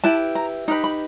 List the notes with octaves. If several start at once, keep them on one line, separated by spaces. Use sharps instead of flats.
E4 G4 B4 A5
A#5
D#4 G4 B4 A#5
B5